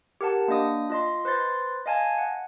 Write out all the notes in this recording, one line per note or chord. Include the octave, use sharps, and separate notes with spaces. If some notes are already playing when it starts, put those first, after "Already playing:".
G4 A#4 F#5 A5
A#3 D4 D#5 D#6
F4 D#5 C6
B4 C5 C6 A6
D#5 F5 G#5 A5 G#6
F#5